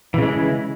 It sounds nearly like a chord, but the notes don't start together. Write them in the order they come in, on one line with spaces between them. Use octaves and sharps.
E3 C#3 G#3 E4